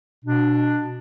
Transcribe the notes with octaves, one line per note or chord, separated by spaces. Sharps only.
B2 D4